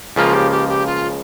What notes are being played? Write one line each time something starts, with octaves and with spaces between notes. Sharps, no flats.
C#2 C#3 F3 A#3 F4
G4
G4
G4
F4